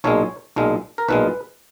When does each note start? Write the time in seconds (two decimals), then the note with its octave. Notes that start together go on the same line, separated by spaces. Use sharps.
0.04 B1 A#2 G#3 C#5
0.56 B1 A#2 G#3
0.98 A#4
1.09 B1 A#2 G#3 B4